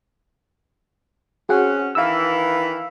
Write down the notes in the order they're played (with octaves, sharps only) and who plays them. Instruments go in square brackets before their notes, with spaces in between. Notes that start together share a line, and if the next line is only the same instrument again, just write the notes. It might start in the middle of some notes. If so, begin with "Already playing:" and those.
[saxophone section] C4 C#4 [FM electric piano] F#4 G#4 F#5
[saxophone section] D#3 E3 [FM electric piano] F5 E6